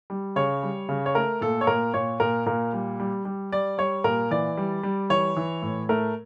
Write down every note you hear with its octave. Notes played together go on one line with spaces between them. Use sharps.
G3
C#3 C#5
G3
C#3
C#5
A3 A#4
A#2 A4
C#5
A#2 A#4
A#2 C#5
A#2 A#4
A#2 A#4
G3
G3
G3
G3 D5
G3 C#5
A#2 A#4
E3 D5
G3
G3
E3 C#5
E3
A2
A3 A#4